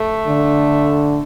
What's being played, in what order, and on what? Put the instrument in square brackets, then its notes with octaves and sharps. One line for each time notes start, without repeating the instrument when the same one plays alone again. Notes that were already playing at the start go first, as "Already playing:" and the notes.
Already playing: [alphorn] A3
[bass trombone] D3